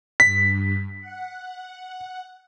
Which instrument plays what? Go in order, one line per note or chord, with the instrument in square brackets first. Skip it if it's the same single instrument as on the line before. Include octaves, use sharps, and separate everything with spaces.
[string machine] G2 [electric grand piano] B6
[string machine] F#5